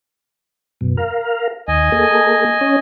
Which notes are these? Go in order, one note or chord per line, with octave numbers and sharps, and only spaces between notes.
F#2 B2
A#4 F5
D#2 D#5 G#5
A#3 G#4 A4
C#4